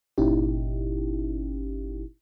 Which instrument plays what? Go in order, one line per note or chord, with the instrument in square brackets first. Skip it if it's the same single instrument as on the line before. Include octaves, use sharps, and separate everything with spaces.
[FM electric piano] G1 A#2 C#4 D#4 E4 G4